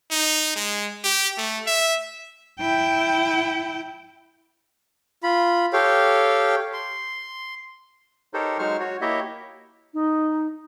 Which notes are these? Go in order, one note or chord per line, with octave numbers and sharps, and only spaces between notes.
D#4
G#3
G4
A3
E5
E4 G5
F4 B5
G4 A4 C#5 F5 G5
C6
D#4 G4 A4 A#4 C5 C#5
F#3 G#3 D#4 C5 C#6 F6
F#4 C#5
A#3 E4 G4 C#5 D#5 E5
D#4